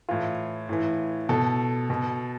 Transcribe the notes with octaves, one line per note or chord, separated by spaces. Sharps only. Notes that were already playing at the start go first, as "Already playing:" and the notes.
A2 E3 F4
A2 E3
B2 A4
B2